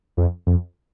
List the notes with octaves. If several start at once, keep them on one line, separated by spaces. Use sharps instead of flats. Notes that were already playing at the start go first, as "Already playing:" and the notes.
F2
F2